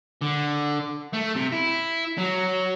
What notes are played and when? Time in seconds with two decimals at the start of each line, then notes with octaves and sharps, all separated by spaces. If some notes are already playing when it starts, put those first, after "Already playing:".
0.21 D3
1.14 A3
1.36 C3
1.52 E4
2.18 F#3